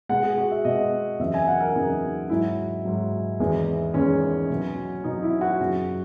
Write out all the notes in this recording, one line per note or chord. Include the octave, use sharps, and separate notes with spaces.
B2 G#3 F#5
G#4
F#4
E5
B2 G#3 D#5
E2 C#3 F#3 E5
G#5
F#5
A#4
E2 C#3 F#3 D#4
G#2 F#3 E4
G#2 F#3
E2 D#3 G#3
E2 D#3 G#3 C#4
B2 F#3
B2 F#3 D#4
E4
F#4
F#2 C#3 F#3